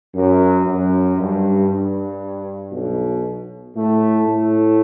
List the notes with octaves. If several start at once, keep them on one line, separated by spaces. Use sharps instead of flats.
F#2
F#2
G2
G2
B1 B2
A2 A3
A2 A3